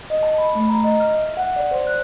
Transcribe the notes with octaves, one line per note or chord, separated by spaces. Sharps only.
D#5
A5
B5
A3
A#5
D#5
F6
E5
F#5
D5
C5
F#6